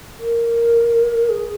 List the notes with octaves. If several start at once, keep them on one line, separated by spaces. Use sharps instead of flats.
A#4
G#4